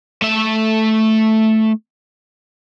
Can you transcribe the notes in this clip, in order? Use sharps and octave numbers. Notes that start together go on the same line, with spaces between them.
A3 E5